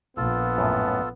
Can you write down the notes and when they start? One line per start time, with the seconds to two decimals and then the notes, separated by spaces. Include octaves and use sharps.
0.17 A#1 B3 F4 A4
0.58 F#2 A2